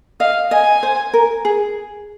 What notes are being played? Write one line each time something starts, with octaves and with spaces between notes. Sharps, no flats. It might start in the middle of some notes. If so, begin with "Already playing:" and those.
D#5 F5
D#5 G#5
C5
A#4
G#4